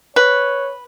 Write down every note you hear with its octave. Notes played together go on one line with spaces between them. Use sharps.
B4 C#5 F#6